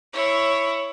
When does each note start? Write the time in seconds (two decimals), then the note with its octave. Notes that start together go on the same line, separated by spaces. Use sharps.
0.13 E4 C#5